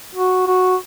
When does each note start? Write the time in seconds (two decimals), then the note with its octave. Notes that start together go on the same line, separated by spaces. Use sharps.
0.15 F#4
0.47 F#4